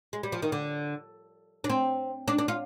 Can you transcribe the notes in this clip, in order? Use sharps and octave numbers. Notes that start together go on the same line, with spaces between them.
G#3
G3
F3
D#3
D3
D4
C4
D4
D4
F4